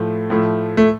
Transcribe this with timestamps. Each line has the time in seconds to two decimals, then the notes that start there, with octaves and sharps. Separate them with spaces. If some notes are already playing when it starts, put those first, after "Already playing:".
Already playing: A2 F3 A3
0.30 A2 F3 A3
0.77 A3